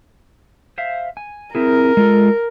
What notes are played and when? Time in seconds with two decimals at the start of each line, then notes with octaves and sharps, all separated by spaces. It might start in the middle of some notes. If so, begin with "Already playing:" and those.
0.78 C5 E5 F5
1.17 G#5
1.55 C4 E4 G#4 A#4
1.97 G#3 F4 A4